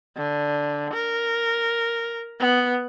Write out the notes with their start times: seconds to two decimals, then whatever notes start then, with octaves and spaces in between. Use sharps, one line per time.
0.17 D3
0.94 A#4
2.40 B3